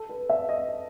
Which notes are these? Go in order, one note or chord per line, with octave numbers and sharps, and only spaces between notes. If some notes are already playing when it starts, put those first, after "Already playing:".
Already playing: A4
B4
E5
D#5